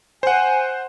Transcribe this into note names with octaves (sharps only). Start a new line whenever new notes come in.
C5 F#5 G#5